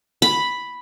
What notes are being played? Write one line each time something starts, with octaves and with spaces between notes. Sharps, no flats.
B5